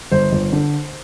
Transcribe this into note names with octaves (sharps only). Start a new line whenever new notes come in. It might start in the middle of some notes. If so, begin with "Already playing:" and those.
G1 C5
G1
D3